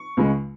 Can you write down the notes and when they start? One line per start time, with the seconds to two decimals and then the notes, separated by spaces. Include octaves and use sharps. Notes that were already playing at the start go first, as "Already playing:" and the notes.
Already playing: C#6
0.17 C#2 C#3 G#3